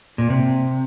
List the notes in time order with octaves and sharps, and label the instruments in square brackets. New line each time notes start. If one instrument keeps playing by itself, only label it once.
[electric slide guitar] A#2
C3